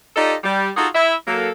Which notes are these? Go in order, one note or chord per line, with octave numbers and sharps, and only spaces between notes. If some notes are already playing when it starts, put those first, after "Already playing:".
D#4 F4 G4 A4 D5 D#5
G3
D#4 F4 F#4 G#4 A4
E4 E5
F#3 A#3 A4